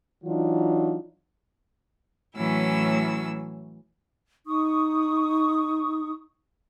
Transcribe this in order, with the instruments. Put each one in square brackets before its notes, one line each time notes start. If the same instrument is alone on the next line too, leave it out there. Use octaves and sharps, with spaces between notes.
[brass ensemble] E3 F#3 D4 D#4 F4
[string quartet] A2 E3 F#3 C#4 E4 E6
[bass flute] D#4 [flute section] C#6 D#6